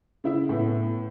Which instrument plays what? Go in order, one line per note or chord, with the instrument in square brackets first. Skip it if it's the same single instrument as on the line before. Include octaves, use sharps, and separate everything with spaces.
[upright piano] C#3 E4 E5
A2 B3